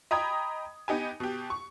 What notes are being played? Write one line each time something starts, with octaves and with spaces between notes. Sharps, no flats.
D#5 G5 A#5 B5 D#6 G#6
B3 D#4 G4 G#5
B2 G4
C#6